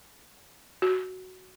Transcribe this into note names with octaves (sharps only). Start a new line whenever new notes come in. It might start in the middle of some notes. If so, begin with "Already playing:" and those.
F#4